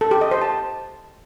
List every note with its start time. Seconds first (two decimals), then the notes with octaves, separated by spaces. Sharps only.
0.01 A4
0.11 G4
0.21 D#5
0.31 C5
0.42 A5